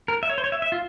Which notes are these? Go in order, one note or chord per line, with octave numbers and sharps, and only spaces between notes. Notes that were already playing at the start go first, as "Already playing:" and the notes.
A#4
E5
C#5
C5
C#5
E5
E5
F4